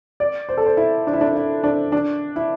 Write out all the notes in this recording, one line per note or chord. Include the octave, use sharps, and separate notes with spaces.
D5
C5
A4
C5
E4
D4
E4
D4
E4
D4
D4
E4